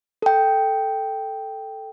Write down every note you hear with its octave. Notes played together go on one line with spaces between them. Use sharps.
A4 G5